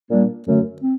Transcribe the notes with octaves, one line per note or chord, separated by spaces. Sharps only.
A#2 G3 A#3 D4
F#2 D3 A3
C4